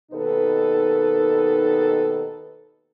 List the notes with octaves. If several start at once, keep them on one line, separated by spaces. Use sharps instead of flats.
D#2 B2 D#3 D#4 A4 B4